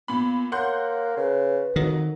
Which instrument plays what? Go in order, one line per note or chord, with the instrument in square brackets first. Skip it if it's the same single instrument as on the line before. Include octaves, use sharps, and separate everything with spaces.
[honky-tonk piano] A#2 B5 [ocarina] B3
[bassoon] A#3 [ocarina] C#5 [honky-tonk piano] F#5 C6 G6
[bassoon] C#3 [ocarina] B4
[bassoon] F2 [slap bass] D#3 [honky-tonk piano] F#3